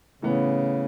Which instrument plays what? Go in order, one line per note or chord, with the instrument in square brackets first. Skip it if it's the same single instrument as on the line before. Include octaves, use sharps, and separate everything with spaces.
[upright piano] A2 E3 B3 [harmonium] C#3